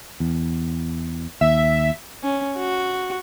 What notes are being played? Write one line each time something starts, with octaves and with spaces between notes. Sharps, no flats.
E2
D#2 E5
C#4
F#4